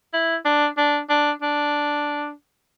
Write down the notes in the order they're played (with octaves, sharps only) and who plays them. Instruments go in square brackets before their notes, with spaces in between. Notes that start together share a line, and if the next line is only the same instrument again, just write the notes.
[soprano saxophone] E4
D4
D4
D4
D4